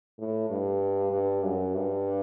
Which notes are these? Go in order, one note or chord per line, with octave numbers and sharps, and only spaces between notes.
A2
G2
G2
F#2
G2